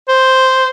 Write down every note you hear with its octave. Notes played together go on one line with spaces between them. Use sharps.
C5